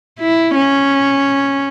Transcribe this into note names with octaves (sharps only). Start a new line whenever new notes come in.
E4
C#4